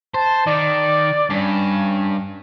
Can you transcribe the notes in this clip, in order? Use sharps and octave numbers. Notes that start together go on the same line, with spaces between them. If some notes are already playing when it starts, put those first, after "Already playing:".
C5 A5
D#3 D5
G2 C#4